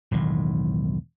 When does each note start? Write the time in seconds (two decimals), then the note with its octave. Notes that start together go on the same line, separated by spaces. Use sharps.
0.11 E1 B1 A2 D#3